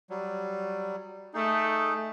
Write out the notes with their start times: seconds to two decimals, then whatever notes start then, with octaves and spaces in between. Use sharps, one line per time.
0.10 F#3 G3
1.34 A3 D#4 G#4